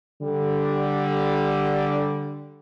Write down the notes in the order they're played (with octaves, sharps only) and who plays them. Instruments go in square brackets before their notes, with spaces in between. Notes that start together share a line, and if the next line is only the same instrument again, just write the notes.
[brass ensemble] D3 G3